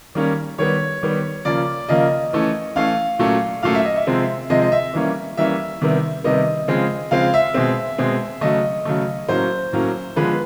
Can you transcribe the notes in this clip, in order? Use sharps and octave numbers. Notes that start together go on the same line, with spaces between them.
D#3 G3 A#3 C#4
D#3 G3 B3 C#5
D#3 G3 B3
C#3 F3 A#3 D5
C#3 F3 A#3 D#5
E3 A3 C#4
E3 A3 C#4 F5
A#2 F#3 A3 C#4
A#2 F#3 A3 C#4 F5
E5
D#5
E5
C3 F3 G#3 C4
C3 F3 G#3 C4 D#5
D#5
E5
E3 G3 A#3 C#4
E3 G3 A#3 C#4 E5
C3 D#3 G3 B3
C3 D#3 G3 B3 D#5
C#3 F3 G#3 C4
C#3 F3 G#3 C4 F5
E5
B2 G#3 C4
B2 G#3 C4
C#3 F#3 A3 D#5
C#3 F#3 A3
A2 F#3 A#3 C#4 C5
A2 F#3 A#3 C#4
D3 F3 G#3 B3 B4